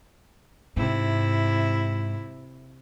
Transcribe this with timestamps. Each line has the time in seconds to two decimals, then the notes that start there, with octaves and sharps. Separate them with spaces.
0.77 G#2 C3 E4